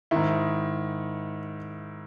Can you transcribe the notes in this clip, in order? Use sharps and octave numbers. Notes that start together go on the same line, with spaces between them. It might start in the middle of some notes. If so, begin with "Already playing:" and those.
G#2 D#3 E4